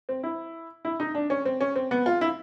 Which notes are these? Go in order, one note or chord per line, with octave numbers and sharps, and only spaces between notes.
C4
E4
E4
D#4
D4
C#4
C4
C#4
C4
B3
F4
E4